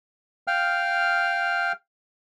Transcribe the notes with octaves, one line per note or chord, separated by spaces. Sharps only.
F5 G5 F6